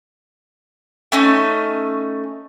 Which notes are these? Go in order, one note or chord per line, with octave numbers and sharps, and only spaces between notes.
A3 C#4 D#4